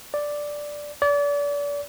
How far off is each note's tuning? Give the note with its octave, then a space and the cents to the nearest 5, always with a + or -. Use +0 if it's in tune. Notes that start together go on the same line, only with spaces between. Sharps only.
D5 +0
D5 -35